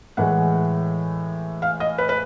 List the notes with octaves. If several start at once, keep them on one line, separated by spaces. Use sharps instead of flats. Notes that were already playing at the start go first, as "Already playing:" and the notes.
A2 E3 G#3 F#5
F5
D#5
B4
B4